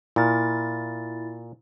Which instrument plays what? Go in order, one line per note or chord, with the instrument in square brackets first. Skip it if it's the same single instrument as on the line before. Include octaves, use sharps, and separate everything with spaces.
[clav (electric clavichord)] A#2 [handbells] E4 A6